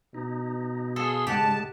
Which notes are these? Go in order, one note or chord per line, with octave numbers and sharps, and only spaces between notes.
B2 D#4
G#4 A4 F5 C6 E6
G#2 C#3 G#3 G4 F#5 A5